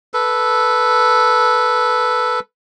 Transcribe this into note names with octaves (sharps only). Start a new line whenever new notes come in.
A4 B4